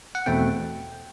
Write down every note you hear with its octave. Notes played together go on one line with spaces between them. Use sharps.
F#5
E2 B2 A3 C4 G5